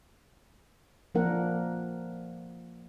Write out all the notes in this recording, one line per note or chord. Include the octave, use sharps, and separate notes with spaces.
F3 A#3 D4 A#4 F#5